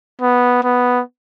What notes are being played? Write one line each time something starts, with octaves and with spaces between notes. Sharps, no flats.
B3
B3